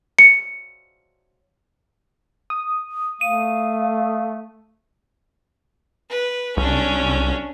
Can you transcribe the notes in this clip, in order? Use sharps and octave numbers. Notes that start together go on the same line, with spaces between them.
C#7
D#6
A3 F5 D#7
B4
C2 C#4 D4